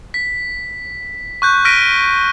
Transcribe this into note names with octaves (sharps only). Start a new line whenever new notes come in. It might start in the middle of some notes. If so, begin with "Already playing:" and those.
B6
C#6 F#6 G6
F6 A#6 B6 D7 D#7